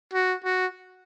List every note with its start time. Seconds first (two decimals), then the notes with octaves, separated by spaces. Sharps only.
0.13 F#4
0.44 F#4